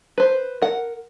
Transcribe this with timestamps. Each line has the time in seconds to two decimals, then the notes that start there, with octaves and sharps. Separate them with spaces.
0.18 B4 C5
0.62 A#4 F#5